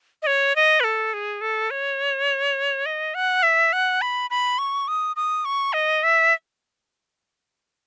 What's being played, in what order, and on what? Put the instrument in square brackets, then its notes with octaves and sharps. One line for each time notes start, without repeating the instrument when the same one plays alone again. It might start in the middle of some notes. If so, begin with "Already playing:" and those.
[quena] D#5
C#5
D#5
B4
A4
G#4
A4
C#5
D#5
F#5
E5
F#5
B5
B5
C#6
D#6
D#6
C#6
D#5
E5